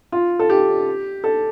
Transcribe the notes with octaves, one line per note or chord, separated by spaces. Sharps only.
F4
A4
G4
A4